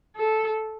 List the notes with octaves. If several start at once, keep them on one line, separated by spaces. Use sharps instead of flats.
A4